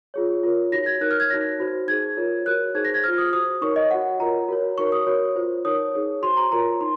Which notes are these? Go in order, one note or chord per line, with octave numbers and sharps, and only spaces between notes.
F4 G#4 C#5
F4 A#4 C#5
D#4 F#4 C#5 A#6
G#6
D#4 A#4 C#5 F#6
F6
G#6
D#4 F#4 A#4 C#5 A#6
D#4 F#4 C5
D#4 G#4 C5 G#6
F4 A#4 C#5
F#4 A#4 C#5 F#6
D#4 G#4 C5 G#6
A#6
G#6
F4 C5 F6
D#6
F#4 C5 D#6
D#4 A#4 C#5 C#6
D#5
F#4 C#5 F#5
F4 A#4 C#5 A#5
F#4 A#4 C#5
D#4 F#4 A#4 C#5 C#6
D#6
F#4 A#4 C#5
F4 C5
D#4 A#4 C#5 D#6
D#4 G#4 C#5
F#4 C5 C6
A#5
F4 A#4 C#5 A#5
D#4 C6